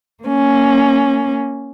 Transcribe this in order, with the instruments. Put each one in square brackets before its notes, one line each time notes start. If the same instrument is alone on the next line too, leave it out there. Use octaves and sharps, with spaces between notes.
[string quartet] A#3 C#4